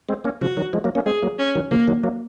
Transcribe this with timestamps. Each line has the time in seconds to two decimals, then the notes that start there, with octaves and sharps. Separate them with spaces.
0.09 G#3 C4
0.24 A#3 C#4
0.41 C#3 F3 F#4
0.57 D#3 F#3
0.73 F3 G#3
0.84 F#3 A#3
0.95 A#3 C#4
1.06 G#3 C4 G#4
1.22 F#3 A#3
1.39 C#4
1.55 D#3 F#3
1.71 C#3 F3 A#3
1.88 D#3 F#3
2.03 F#3 A#3